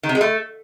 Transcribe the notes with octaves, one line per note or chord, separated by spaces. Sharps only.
D#3
C3
G#3
A3